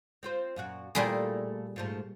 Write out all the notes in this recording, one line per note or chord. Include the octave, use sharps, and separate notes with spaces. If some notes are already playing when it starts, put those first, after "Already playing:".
C4 F4 C5
F#2 A#2 F#4
A#2 G3 A3 A#3 E4 G#4
G#2 F3 A3